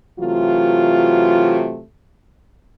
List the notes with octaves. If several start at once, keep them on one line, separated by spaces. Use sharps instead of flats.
C3 E3 F#3 A3 F4